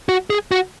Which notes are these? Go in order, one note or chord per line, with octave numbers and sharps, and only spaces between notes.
F#4
G#4
F#4